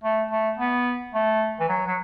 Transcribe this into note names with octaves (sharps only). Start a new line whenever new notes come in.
A3
A3
B3
A3
E3
F#3
F#3